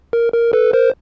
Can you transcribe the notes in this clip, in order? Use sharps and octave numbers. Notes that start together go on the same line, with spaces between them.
A#4
A#4
A4 B4
A#4 C5